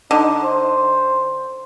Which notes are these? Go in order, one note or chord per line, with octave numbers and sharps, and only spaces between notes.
D3 D#4
C5